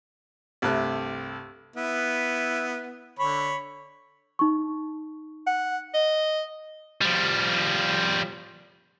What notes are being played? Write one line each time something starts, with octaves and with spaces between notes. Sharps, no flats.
C2 G2 A3 F#6
B3 E4
D3 C#5 B5
D#4 C#6
F#5
D#5
F3 G3